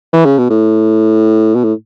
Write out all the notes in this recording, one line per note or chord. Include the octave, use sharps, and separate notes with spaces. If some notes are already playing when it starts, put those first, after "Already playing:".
E3
C#3
B2
A2
B2
A2